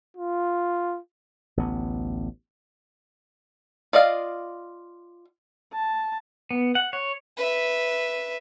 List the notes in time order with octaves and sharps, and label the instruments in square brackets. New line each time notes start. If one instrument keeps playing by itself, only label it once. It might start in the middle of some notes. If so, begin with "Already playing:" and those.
[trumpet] F4
[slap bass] A1 D2 B3
[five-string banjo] F4 D5 D#5 F5
[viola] A5
[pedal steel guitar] B3
F#5
C#5
[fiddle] B4 E5